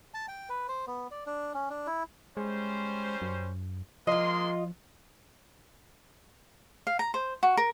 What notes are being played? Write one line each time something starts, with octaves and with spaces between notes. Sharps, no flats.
A5
G5
B4
C5
B3
D5
D4
C#4
D4
E4
G3 G#3 C#4 C5
F#2
F3 G#3 A#3 F4 D#5 C6
F5
A#5
C5
F#4
A#4